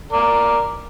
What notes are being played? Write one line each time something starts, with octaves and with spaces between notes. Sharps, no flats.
A#4 D5